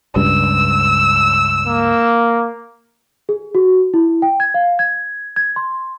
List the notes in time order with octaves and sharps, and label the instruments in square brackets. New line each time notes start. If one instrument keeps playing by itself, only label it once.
[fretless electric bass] C#2 G2 [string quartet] E6
[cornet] A#3
[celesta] G#4
F#4
E4
G5
G#6
F5
G#6
G#6
C6